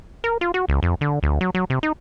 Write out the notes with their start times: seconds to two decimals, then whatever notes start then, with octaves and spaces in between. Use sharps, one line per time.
0.24 A#4
0.41 F4
0.54 F#4
0.69 C#2
0.83 F2
1.01 D3
1.23 D2
1.41 F#3
1.55 F#3
1.70 C3
1.83 D#4